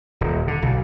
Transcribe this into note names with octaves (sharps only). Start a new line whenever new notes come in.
D#1
D3
B1